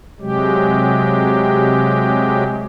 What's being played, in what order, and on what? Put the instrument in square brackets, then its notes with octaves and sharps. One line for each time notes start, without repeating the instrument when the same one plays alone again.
[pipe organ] C3 F#3 G#3 G4